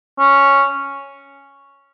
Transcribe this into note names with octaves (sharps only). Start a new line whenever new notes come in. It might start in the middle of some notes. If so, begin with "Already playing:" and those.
C#4